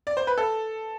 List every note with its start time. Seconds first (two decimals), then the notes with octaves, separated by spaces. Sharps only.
0.07 D5
0.17 C5
0.27 B4
0.38 A4